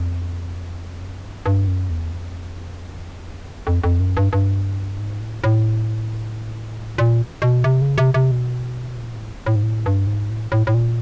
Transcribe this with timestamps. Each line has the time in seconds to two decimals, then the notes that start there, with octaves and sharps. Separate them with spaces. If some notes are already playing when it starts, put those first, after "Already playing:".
Already playing: F2
1.01 F#2
1.23 G2
1.46 G2
1.68 F#2
1.90 E2
2.12 F2
3.67 F2
3.84 F2
4.00 F#2
4.17 G2
4.33 G2
4.99 G#2
5.21 A2
5.44 A2
6.98 A#2
7.42 B2
7.64 C3
7.82 C#3
7.98 C3
8.14 C3
8.31 B2
8.97 A#2
9.14 A2
9.46 A2
9.56 G#2
9.63 A2
9.86 G2
10.07 G#2
10.30 A2
10.52 A2
10.67 A2
10.74 A#2